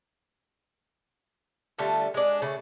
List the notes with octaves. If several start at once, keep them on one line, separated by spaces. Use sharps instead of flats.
D3 G3 A3 F4
G#3 D4
C#3 A3